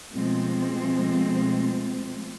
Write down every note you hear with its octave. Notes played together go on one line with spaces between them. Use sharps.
B2 F3 G#3 A3 C4